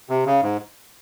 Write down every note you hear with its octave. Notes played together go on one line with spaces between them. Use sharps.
C3
C#3
G#2